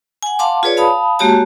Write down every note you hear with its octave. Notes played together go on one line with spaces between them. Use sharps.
F#5 G#5
F5 F#5 A5 C6 D6
F4 G#4 B4 C#5 D5
F5 A5 B5 D#6
G#3 A#3 F#4 G4 C#5 A5